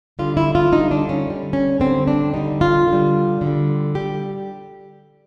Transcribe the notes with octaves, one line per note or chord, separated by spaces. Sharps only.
D3 G3 F4
E4
F4
D3 G3 D#4
D4
C#4
D3 G3
C#4
D3 G3 C4
D4
D3 G3 D#4
F4
D3
G3
D3 G3
G3 G4